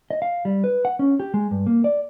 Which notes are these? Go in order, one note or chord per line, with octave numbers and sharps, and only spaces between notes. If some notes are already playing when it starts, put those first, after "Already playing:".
D#5
F5
G3
B4
F#5
C#4
G4
G#3
G2
A#3
D5